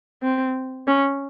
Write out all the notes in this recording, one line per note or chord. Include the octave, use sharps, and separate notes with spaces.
C4
C#4